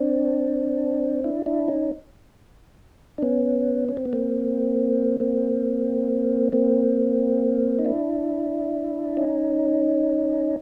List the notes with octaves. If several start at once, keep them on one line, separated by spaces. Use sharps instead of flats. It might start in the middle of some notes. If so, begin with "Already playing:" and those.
Already playing: C4 D4
D4 E4
D4 E4
C#4 D#4
D4
B3 C#4
C#4
C4
B3
A#3 C4
A#3 C4
A#3 C4
D#4
D4 E4
C#4 D#4